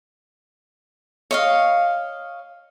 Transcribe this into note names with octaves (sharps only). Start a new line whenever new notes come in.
C#5 D#5 F5